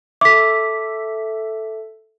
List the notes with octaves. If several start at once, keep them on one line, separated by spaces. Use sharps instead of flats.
A4 E5 D6 B6